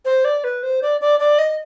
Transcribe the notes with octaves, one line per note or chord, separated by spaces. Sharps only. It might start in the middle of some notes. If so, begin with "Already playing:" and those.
C5
D5
B4
C5
D5
D5
D5
D#5